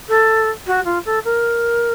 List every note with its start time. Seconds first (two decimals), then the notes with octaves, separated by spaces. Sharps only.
0.08 A4
0.66 F#4
0.85 F4
1.05 A4
1.24 A#4